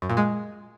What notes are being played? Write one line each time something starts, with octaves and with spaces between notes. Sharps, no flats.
F#2
A#2
G#3